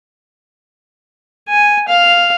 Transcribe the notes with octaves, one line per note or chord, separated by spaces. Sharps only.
G#5
F5